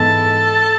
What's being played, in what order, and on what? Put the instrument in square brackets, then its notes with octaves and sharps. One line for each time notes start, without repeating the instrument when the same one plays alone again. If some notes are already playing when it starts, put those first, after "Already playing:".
Already playing: [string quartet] G#2 E3 G#3 B3 A4 A5